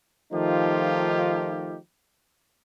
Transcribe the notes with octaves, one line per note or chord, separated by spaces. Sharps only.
D#3 F3 A3 D#4 F4 G4